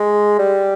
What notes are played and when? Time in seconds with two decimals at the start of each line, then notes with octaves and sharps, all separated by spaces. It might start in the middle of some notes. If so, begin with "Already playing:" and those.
Already playing: G#3
0.39 G3